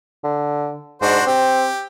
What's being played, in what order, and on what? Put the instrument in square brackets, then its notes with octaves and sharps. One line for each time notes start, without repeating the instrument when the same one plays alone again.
[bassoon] D3
[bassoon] G#2 [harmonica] D4 F#4 C5
[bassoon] C4 [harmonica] G4